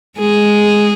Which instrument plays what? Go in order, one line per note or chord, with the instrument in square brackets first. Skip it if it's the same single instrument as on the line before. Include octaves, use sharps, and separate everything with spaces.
[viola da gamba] G#3 G#4